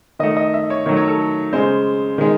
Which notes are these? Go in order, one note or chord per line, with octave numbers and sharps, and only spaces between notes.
D#3 A3 D#5
D#5
E5
C#5
D#3 F#3 A3 C#5
C#5
A4
C#3 G#3 C5
D#3 G#3